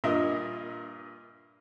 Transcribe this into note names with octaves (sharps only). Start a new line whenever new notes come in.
G2 A#2 F4 A#4 D#5 E5